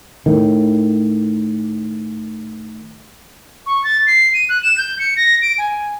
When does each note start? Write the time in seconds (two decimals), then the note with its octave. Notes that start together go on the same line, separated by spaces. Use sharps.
0.26 A2 D#3
3.66 C#6
3.84 A6
4.07 C7
4.34 D#7
4.49 F#6
4.63 E7
4.78 G6
4.99 C#7
5.17 A#6
5.42 D7
5.58 G#5